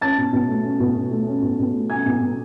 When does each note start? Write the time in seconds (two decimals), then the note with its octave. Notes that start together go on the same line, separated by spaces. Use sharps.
0.01 C#4 A5 A6
0.18 B2
0.33 B2
0.49 A3
0.64 C#4
0.80 B2
0.96 B2
1.11 A3
1.27 C#4
1.42 B2
1.59 B2
1.74 A3
1.90 C#4 G#5 G#6
2.06 B2
2.21 B2